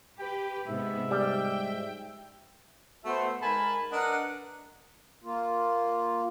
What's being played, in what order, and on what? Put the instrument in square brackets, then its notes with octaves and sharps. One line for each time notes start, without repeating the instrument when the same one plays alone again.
[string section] G4 B4 [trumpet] G5
[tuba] G#2 [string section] C3 B3 [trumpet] E5
[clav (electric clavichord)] G3 [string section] G5
[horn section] A3 B3 F#4 A4 C5 E5
G#2 A#4 G#5 A5 B5
D4 A#4 B4 D#5 F#5
[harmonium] A#3 F4